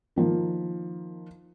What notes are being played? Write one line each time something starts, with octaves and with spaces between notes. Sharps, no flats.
D#3 F3 A#3